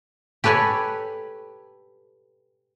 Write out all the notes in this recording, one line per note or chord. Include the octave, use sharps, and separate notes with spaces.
G4 A4 B4 C#5 G#5